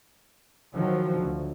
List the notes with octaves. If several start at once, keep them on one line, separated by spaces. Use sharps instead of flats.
D#3 F3 F#3
D2